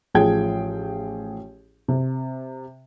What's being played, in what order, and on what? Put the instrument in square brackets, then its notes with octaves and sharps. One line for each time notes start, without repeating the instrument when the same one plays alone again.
[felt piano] A1 F3 G#4 G5 G#6
C3